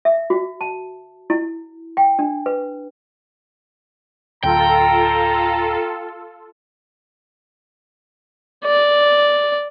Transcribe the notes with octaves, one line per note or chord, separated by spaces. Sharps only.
E5
F#4
A5
E4
G5
D4
B4
D1 F4 A4 G5 A#5
D5